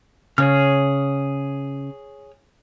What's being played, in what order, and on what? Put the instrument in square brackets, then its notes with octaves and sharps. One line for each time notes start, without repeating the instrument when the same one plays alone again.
[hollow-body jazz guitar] C#3 [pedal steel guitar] G#4 C#5 F6